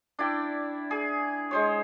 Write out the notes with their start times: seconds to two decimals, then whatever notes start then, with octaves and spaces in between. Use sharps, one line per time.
0.19 D4 E4 D5 G5
0.91 G#4
1.51 G#3 C5 C#5